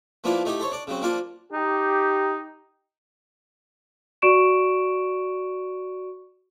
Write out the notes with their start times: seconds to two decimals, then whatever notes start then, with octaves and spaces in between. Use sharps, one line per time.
0.24 F3 A#3 B3 D4 E4 F4
0.45 A3 D#4 E4 G4
0.59 A4 C5 C#5
0.72 D4 D5
0.87 C#3 F#3 C4
1.02 F3 A#3 D4 F4 D5
1.53 D#4 G4
4.22 F#4 D5 C#6 D7 E7